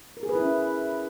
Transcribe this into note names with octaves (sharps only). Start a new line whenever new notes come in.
A#4
G#4
B4
E4
C#4